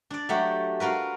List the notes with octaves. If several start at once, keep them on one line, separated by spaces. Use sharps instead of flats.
D4 D5
F#3 A3 G4 F#5
F4 F#4 A#4 B4